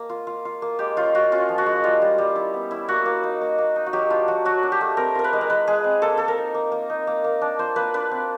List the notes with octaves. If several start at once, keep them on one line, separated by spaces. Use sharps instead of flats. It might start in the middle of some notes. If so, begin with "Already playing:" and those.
Already playing: A#3
F4
F4
F4
A#3
G#3 G4
C#4 F4
F4 F#4
C#4 F4
F3
F#4
G#3
G3 F4
G3
G3
E4
B3
E4
A#3 F#4
A#3
D#4
A#3
A#3
D#4
F#4
F#3 G4
D4 F4
F#3 F#4
F#3 F#4
D4
G4
A3
C4 A#4
F4 A#4
B4
G#3
A#4
G#3 B4
G#3 G#4
C4
A#3 A4
A#3 A4
A#4
D#4
A#3
A#3
D#4
A#3
A#3
D4
F4 C5
A#3 B4
D4 B4
C4